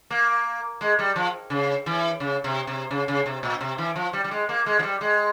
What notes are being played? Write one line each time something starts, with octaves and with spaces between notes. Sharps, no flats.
A#3
G#3
G3
F3
C#3
E3
C#3
C3
C3
C#3
C#3
C3
A#2
C3
E3
F3
G3
G3
G#3
A#3
G#3
F3
G3
G#3